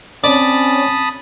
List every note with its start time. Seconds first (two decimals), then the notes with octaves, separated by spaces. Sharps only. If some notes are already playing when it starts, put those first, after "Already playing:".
0.24 C4 C#4 D5 A5 B5 D#6